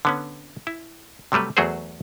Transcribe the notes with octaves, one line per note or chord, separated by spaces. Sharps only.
D3 B3 C#4
E4
C3 F#3 G3 A3 B4
E2 F#3 A3 F#4 G#4 C5